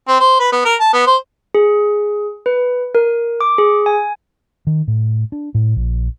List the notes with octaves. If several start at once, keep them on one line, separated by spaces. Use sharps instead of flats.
C4
C5
B4
B3
A#4
A5
B3
C5
G#4
B4
A#4
D6
G#4
G#5
D#3
A2
D4
A2
A#1